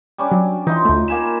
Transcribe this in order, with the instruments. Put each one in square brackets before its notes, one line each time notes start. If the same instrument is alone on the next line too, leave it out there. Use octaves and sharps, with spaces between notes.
[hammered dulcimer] G3 C#4 D4
[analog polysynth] F#3
[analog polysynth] E3 [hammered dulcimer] D#4 F4 C6
[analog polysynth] D2 A3
[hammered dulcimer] A#3 G#5 B5 [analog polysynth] E7